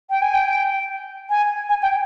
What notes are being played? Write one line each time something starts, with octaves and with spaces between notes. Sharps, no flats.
G5
G#5
G5
G#5
G#5
G5